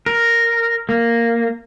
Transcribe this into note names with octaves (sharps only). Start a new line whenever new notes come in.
A#4
A#3